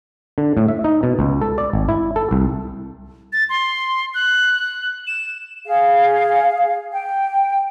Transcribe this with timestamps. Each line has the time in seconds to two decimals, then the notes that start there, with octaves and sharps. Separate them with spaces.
0.38 D3
0.57 A2
0.68 E5
0.84 D#4
1.03 B2
1.19 C#2
1.41 A4
1.58 D5
1.73 G#1
1.89 E4
2.16 A4
2.31 C2
3.33 A6
3.49 C6
4.14 F#6
5.07 E7
5.66 G#4 F5
6.92 G5